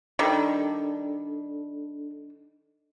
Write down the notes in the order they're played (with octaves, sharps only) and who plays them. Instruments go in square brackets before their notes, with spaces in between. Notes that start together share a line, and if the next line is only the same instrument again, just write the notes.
[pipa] D#3 G3 [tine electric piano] D4 A4